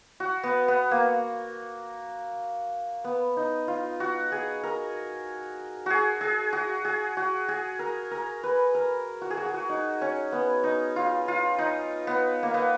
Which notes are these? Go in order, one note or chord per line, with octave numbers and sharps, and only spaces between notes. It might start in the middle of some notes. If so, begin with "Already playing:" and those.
F#4
B3
B3
A#3
B3
D#4
F4
F#4
G#4
A#4
F#4 G#4
G#4
F#4
G#4
F#4
G#4
A#4
A#4
B4
A#4
F#4
G#4
F#4
G#4
F#4
D#4
C#4
B3
D#4
F4
F4
D#4
B3
A#3
B3